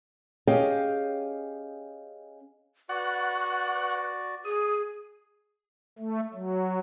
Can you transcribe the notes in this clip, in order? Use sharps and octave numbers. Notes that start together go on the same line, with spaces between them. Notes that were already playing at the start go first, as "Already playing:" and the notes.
C#4 G4 G#4 D#5 F5 G5
F#4 B4 D5 F#5 C#6
G#4 D#6
A3
F#3